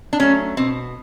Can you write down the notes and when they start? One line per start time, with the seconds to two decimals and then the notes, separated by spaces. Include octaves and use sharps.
0.13 D4
0.19 F#3 A3 C#4
0.57 B2 C4